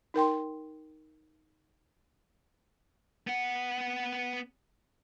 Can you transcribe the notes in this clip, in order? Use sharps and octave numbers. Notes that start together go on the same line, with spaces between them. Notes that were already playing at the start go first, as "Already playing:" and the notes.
D#4 A#4 G5 C6
B3 F#5